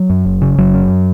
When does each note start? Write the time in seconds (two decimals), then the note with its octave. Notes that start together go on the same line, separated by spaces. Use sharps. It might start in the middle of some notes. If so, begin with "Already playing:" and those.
Already playing: F#3
0.10 F#2
0.25 F#1
0.42 C#3
0.58 F#1 F#3
0.74 F#2